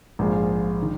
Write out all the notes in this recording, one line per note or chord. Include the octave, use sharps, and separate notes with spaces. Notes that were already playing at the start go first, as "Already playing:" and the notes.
A#1 G#2 G#3 F4
D#3